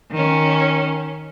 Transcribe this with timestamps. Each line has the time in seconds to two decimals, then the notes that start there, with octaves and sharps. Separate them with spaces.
0.12 D#3 C#4